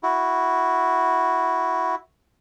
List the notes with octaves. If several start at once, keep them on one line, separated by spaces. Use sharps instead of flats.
E4 F#4